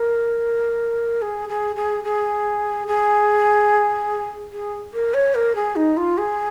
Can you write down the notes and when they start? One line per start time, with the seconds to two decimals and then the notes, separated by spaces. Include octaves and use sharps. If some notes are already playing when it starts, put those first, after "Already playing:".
Already playing: A#4
1.22 G#4
1.49 G#4
1.76 G#4
2.04 G#4
2.87 G#4
4.52 G#4
4.93 A#4
5.14 C#5
5.35 A#4
5.55 G#4
5.76 D#4
5.97 F4
6.18 G#4